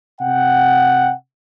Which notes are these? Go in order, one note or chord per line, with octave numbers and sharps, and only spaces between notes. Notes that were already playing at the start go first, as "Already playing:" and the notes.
C3 F#5 G5